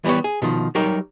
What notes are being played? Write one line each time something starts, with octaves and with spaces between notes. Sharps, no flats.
E3 G3 B3 G4 C#5
G#4
B2 D#3 F3
F#3 G3 D#4 G4 A#4